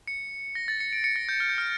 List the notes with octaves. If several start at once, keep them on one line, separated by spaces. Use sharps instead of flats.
C#7
A#6
A6
C#7
D7
C#7
A#6
G6
F6
G6
F6